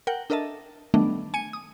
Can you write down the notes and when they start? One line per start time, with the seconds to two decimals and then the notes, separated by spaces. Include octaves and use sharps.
0.07 A#4 F#5 G5
0.30 D4 A4 A#4 D#5 E5 A5
0.94 D#3 F#3 G3 A3 B3 D4
1.34 G#5 C#7 D#7
1.53 D#6